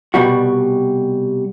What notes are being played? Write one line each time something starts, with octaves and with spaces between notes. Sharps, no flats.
C2 B2 G3 F#4